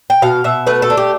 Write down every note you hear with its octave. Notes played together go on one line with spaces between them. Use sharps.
G5
B2 F5
B2 E5
A3 B4
A4
D4
G4